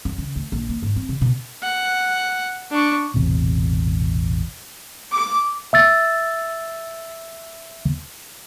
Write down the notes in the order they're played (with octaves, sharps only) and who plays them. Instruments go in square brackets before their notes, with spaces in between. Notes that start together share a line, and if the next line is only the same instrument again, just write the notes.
[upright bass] F#2
C#3
D2
A#1
A#3
G#2
C4
C3
B2
[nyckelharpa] F#5
D4 C#6
[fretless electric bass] E1 A1 C3
[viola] D6
[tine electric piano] E5 E6 A6